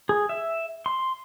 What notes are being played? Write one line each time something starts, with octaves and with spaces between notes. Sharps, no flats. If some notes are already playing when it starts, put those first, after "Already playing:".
G#4
E5
C6